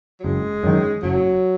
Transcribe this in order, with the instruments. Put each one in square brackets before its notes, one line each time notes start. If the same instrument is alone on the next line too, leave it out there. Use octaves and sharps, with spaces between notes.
[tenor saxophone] F#3
[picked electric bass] F#1 [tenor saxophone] G#3
[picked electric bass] F#2 D#3
[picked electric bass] F#1 [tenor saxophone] F#3